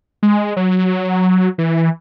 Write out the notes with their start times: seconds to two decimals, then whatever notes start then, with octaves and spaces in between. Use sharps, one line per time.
0.23 G#3
0.57 F#3
1.58 E3